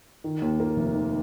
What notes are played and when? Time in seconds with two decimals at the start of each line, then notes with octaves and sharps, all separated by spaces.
0.24 D#3
0.42 D#2
0.60 A#3
0.77 F1
0.95 D#3